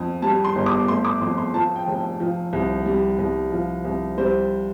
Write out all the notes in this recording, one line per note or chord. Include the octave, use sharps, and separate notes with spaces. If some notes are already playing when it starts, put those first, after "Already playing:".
Already playing: F2
G3 A5
C6
G1
D6
A3 C6
D6
F2 C6
C6
F3 A5
G5
F1
F3
C2
G3
C2
F3
C2
G3 C5